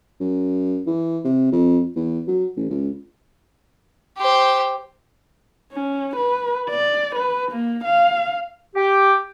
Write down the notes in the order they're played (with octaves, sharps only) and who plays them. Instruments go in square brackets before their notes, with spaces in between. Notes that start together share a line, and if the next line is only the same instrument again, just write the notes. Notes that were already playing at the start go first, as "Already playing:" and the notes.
[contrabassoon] F#2
E3
C3
F2
E2
F#3
A1
C#2
[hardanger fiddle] G4 C5
[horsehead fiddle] C#4
B4
D5
B4
A#3
F5
[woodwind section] G4